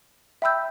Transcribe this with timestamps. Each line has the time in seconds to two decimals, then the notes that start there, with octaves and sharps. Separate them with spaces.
0.42 E5 G5 B5 E6 G6